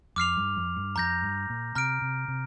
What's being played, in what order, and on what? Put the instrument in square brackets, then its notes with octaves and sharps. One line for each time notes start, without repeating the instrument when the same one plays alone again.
[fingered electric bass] F2 [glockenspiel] D6 F6 C7 F7
[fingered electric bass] G2
F2
G2
[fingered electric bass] F2 [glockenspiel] A#5 G6 A#6
[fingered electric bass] G2
A#2
[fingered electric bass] C3 [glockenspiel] A#5 F6 D7
[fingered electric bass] C3
C3